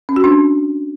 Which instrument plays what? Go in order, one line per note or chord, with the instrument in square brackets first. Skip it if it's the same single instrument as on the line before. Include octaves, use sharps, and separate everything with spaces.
[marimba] C#4
F#4
D4